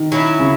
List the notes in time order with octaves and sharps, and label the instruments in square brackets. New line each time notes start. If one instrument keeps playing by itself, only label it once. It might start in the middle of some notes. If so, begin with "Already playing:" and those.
Already playing: [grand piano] D#3
[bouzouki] F#3 C#4 E4
[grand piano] C#3